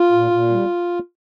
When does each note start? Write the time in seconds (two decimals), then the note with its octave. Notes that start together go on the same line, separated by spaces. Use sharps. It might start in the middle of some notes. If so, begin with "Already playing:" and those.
Already playing: F4
0.12 A#2
0.31 A#2
0.50 G3